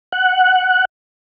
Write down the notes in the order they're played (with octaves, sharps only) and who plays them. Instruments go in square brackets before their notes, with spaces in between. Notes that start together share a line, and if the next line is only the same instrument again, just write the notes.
[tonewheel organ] F#5